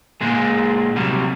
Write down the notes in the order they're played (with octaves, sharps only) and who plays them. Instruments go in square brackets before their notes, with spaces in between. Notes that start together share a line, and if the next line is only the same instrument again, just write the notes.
[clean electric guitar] A#2 G#3 G#4
C3 F#3 G3